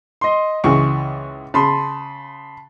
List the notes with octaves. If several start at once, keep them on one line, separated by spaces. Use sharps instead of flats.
D#5 C6
C#2 E3 G#3 C#6
C#3 A5 B5 C6